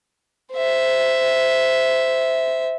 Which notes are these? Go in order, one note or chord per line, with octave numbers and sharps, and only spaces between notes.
C5 E5